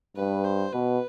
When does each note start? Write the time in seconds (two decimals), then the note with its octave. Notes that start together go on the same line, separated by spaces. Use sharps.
0.16 G2 B4
0.44 C5
0.73 B2 B4